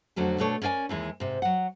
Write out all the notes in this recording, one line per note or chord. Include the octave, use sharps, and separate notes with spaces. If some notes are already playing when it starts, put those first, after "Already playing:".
F2 D3 F#3 A3 C#4
B2 A3 D4 A4 C#5
C#4 A#4 D5 F5 G#5
D#2 E3 G#3
G#2 C3
F#3 F#5